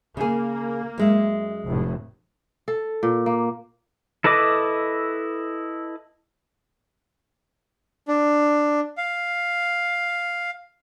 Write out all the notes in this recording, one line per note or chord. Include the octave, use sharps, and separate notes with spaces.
C#3 A#3 G#4
F#2 G#3 E5
F1 A2
A4
A#2
A#3
E4 A4 B4 D#5 D6
D4
F5